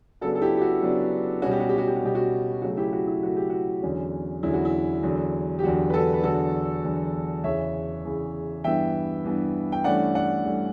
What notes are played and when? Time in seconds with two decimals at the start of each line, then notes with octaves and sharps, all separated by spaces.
0.21 C#3 F#3 B3 D4 F#4 A4
0.35 A4
0.42 E4 G4
0.57 G4
0.62 F#4
0.82 C#3 F#3 B3 D4
1.42 B2 G3 C#4 F#4
1.51 G4
1.60 F#4
1.69 G4
1.78 F#4
1.88 G4
1.97 F#4
2.02 B2 G3 C#4 G4
2.15 F#4
2.62 C#3 F#3 A3 F#4
2.77 E4 G4
2.93 F#4
3.08 E4
3.23 C#3 F#3 A3 F#4
3.37 G4
3.50 F#4
3.83 E2 D3 F#3 C#4
4.43 E2 D3 F#3 C#4 E4
4.54 F#4
4.65 E4
5.03 E2 D3 F#3
5.59 G4
5.63 E2 D3 F#3 F#4
5.90 B4
5.94 F#4 A4
6.13 B4
6.24 E2 D3 F#3 F#4 A4
6.84 E2 D3 F#3
7.44 E2 C#3 E3 C#5 E5
8.05 E2 C#3 E3
8.64 G2 E3 B3 E5 G5
9.24 G2 E3 B3
9.72 G5
9.84 G2 E3 A3 C#4 D5 F#5
10.15 D5 F#5
10.45 G2 E3 A3 C#4